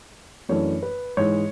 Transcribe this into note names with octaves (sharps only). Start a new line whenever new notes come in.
F#2 E3 A3 D4 C#5
B4
G#2 E3 G#3 C#5